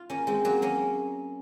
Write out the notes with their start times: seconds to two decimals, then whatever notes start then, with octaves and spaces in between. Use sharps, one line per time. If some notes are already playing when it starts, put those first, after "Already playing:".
Already playing: F4
0.10 A#3 C#4
0.27 G#3 C4
0.45 F#3 A#3
0.62 A#3 C#4